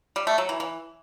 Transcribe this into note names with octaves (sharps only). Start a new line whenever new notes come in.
G3
A3
F#3
E3
E3